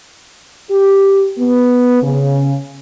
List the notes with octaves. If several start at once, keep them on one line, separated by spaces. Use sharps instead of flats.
G4
B3
C#3